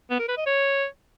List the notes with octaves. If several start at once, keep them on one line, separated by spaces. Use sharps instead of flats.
B3
A#4
B4
D#5
C#5